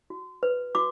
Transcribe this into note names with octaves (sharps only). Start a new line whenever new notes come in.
F#4
B4
F#4 D6